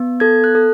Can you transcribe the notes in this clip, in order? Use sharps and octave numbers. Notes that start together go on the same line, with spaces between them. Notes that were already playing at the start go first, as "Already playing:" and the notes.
Already playing: B3
A4 G#6
F#6
A4